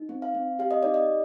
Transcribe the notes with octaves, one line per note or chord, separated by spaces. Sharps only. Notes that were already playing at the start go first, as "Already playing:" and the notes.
Already playing: D#4
C4
F5
C4
G4 F5
D#5
D#4 D5
D#5